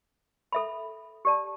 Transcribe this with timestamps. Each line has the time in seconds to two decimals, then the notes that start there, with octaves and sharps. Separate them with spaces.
0.52 A4 E5 B5
1.25 G4 D5 A5